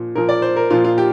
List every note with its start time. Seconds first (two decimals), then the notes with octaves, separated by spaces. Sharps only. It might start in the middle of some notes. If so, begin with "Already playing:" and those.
Already playing: A#2 F3
0.15 A#2 F3 A#4
0.29 D5
0.42 C5
0.56 A#4
0.70 A#2 F3 F4
0.84 F4
0.98 G4